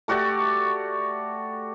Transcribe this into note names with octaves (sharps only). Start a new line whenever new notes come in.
A3 F#4 G4 D5